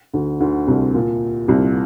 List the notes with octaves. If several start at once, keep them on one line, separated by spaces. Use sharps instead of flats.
D2 D3
D2 D3
C2 C3
A#2
C2 C3